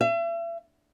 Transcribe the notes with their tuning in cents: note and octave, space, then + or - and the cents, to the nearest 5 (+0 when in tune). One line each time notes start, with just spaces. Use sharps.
E5 +40